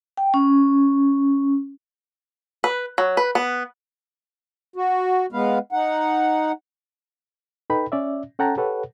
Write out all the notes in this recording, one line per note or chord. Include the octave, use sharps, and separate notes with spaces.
G5
C#4
B4
F#3
B4
B3
F#4
G#3 B3 B4 F5
D#4 F#5
D#4 A4 B4 G5 B5
C#4 D5 E5
C#4 A4 F#5 G5 A5 A#5
G4 A4 B4 C#5 F#5